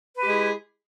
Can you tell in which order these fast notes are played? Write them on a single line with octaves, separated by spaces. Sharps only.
B4 G4 G#3 G#4 E4